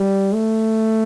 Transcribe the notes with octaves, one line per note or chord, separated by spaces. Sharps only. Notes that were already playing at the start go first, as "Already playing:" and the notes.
Already playing: G3
A3